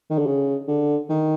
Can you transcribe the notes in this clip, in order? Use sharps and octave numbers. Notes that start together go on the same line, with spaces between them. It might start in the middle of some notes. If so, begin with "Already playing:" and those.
D#3
D3
C#3
D3
D#3